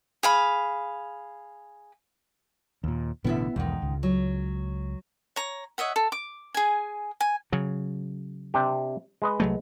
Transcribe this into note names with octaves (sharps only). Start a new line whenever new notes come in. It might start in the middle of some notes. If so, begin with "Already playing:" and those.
G#4 F5 B5
D#2 A#2
A1 B2 D3 B3 E4 E5
B1 E2 G#2 D#3
C#2
F#3
C#5 A#5
C#5 D#5 E5 F#5
A4
D6
G#4 G#5
G#5
C#3 F#3
C3 D4 G4
G#3 B4 D#5
C2 F#3 A3